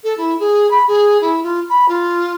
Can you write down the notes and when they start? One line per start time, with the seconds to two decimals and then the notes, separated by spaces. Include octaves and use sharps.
0.03 A4
0.17 E4
0.39 G#4
0.70 B5
0.87 G#4
1.21 E4
1.43 F4
1.69 B5
1.88 F4